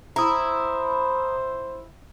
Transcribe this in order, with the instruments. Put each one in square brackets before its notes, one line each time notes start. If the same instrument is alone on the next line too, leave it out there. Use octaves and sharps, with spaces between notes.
[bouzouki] E4 [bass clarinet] C5 [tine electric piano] A#5 D#6